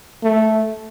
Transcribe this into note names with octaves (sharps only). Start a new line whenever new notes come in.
A3